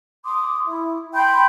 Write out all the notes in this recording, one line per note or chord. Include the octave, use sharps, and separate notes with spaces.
C6 D6 D#6
E4
G5 B5 C6 G6